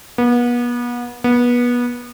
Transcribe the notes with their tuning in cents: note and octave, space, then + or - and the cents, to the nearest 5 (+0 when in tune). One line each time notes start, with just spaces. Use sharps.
B3 -35
B3 -25